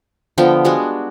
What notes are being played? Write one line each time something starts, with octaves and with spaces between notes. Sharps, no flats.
D3 F3 B3 G5
G3 G#3 D4 F#4